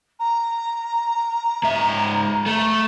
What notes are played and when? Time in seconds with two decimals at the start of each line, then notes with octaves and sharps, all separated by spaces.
0.19 A#5
1.63 G#2 E5
2.46 A3